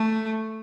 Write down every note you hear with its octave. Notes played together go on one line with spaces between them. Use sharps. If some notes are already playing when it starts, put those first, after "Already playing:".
Already playing: A3